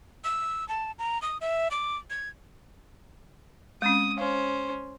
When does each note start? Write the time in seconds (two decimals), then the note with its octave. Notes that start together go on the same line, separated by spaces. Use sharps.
0.24 E6
0.69 A5
0.99 A#5
1.22 D#6
1.41 E5
1.71 D6
2.10 G#6
3.82 G#3 C4 C#4 D#6
4.18 C#4 C5 F5